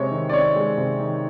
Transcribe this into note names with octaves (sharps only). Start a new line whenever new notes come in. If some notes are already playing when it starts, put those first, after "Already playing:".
Already playing: C3 G#3 C4 C#5
D#3
D5
C4 C#5
G#3
C3
D#3